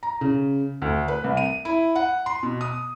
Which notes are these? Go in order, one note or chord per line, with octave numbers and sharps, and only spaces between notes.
A#5
C#3
D2
B4
C2
D#7
E4
F#5
C6
B2
D#6